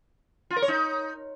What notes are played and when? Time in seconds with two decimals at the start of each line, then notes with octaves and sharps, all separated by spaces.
0.50 F4
0.56 A#4
0.62 C#5
0.68 D#4